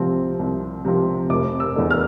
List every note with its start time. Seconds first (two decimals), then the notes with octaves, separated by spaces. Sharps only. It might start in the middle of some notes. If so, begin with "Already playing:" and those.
Already playing: C2 C3 F3 C4
0.39 C2
0.85 C3 F3 C4
1.30 F1 D6
1.60 E6
1.75 E2 B2 A3 D4
1.90 F6